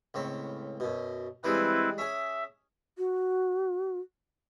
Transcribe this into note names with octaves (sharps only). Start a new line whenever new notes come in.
C#2 A2 C4
F#2 B2
E3 G3 G#3 C4 E4 B4
C#4 G#4 E5
F#4